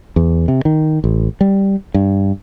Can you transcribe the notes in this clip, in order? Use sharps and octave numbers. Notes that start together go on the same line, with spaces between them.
E2
C3
D#3
A1
G3
G2